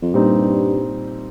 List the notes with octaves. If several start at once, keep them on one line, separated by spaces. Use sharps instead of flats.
F2
G2 A#2 G3 C4 D#4